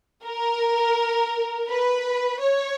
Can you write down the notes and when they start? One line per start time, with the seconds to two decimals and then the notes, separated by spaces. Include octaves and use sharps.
0.24 A#4
1.68 B4
2.41 C#5